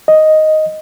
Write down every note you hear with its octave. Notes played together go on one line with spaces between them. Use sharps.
D#5